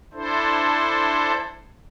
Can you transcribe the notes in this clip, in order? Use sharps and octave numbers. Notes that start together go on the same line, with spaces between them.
D4 E4 A4 C5